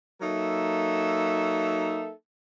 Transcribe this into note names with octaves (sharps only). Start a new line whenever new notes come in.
F#3 A#3 D#4 A4 E5